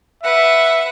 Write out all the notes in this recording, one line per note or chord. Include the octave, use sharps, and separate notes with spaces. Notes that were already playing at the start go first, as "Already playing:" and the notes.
B4 E5 F#5